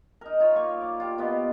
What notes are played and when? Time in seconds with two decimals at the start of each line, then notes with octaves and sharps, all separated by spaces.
0.21 D#4 A#4
0.40 D#4 F4 C#5
0.56 A#3 F5 C#6
0.81 D5
1.00 F4 G4
1.18 B2 D#3 B3 G4